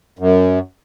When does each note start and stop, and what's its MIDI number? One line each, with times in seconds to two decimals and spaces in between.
0.19 0.59 42